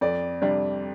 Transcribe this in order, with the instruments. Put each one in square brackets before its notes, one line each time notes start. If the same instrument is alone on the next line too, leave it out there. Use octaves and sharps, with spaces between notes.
[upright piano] F2 [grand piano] D5
[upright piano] C3 G3 D4